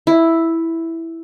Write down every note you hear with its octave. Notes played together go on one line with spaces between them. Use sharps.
E4